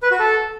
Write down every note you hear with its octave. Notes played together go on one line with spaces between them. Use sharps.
B4
F#4
A4